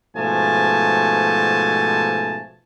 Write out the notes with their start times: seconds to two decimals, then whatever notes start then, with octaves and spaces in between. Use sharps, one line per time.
0.16 G#2 B2 F3 A3 G#5 A5